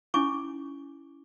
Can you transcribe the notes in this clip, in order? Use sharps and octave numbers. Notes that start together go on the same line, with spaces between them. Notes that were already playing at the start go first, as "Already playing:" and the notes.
C#4 D#4 E4 G#5 C#6 D6